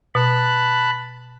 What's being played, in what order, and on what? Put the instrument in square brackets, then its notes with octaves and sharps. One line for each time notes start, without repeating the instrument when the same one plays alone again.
[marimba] B2 [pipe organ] A5 B5 F#6